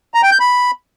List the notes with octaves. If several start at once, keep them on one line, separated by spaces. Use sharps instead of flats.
A#5
G5
G6
B5